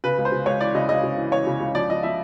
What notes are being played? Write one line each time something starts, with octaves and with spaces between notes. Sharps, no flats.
C#3 B4
C#2
C5
C#3
C#2 C#5
E3 D5
C#3 D#5
C#2 D#5
C#3
E3
E3 C#5
C#3
C#2
F3 D5
F3 D#5
F3 E5